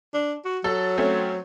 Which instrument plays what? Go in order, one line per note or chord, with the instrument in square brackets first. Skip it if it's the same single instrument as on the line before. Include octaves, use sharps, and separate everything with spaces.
[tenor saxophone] D4
F#4
[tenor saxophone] F#3 [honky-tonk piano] A4
[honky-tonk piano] A3 C4 C#4